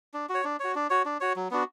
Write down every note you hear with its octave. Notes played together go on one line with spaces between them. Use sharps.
D4
F#4
C#5
D4
F#4 C#5
D4
F#4 C#5
D4
F#4 C#5
F#3
B3 D4 F#4